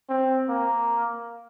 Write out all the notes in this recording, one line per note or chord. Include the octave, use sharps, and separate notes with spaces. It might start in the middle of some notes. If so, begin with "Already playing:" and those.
C4
A#3